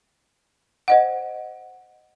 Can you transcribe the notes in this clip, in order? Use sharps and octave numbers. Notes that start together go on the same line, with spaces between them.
C5 D#5 F#5